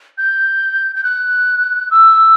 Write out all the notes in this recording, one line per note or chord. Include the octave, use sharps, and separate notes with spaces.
G6
G6
F#6
E6